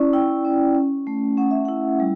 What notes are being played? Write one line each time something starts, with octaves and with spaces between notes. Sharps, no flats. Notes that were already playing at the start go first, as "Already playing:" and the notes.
Already playing: C#4 E4 D5
E4 G5
C#4
C#4
A3
C#4 F#5
E5
E4 F#5
G3